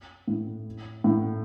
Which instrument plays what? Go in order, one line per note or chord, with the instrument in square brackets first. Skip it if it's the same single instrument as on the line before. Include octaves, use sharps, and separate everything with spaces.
[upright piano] A2
A2